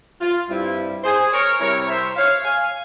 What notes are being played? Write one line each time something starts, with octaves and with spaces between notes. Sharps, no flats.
F4
G2 G3 C4 E4
G#4 C5
A#4 C#5
C3 G3 C4 E4 A#4 C#5
C5 E5
C#5 F5
F5 G#5